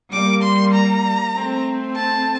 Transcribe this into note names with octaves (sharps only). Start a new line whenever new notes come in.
G3 A#3 D6
C6
A#5
A3 C4
A5